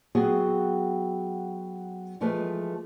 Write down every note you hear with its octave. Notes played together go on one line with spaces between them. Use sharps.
F#3 B3 C4 F#4 G#4
E3 F3 G#3 A3 B4